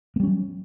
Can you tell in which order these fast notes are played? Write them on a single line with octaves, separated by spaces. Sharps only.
A#3 G3 C#4 F#3